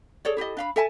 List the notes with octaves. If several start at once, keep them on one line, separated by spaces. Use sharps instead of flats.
G#4 A4 C#5 D5
E4 G4 A4 D#5
D4 F5 B5
A4 E5 G#5 A5